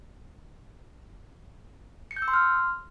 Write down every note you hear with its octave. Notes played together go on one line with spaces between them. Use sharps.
C#7
G6
E6
C6
F6